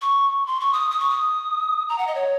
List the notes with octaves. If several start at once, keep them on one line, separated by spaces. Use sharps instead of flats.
C#6
C6
C#6
D#6
D#6
C#6
D#6
A#5
F#5
D#5
C#5